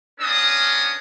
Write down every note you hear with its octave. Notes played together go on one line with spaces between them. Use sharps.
B3 C#4 D4 A#4 D#6